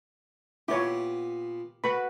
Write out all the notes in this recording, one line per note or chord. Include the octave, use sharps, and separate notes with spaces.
A#2 B3 E4 G4 C#5
F#4 B4 B5